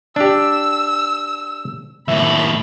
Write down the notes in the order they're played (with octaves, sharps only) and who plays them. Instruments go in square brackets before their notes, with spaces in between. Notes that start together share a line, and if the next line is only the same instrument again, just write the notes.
[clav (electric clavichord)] D4 G4 [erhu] E6
[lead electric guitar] D#2 A2 [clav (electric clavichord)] E5 [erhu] B5